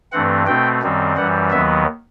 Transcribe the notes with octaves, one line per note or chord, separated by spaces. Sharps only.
G2 E3 A3 C4 F#5
B2 A3 C4 G5
F#2 D#3 G3 C4
F#2 E3 G3 F#5
D#2 D#3 F#3 B3 E5